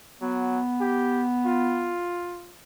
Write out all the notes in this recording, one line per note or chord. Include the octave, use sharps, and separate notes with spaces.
F#3 B3
G4
F4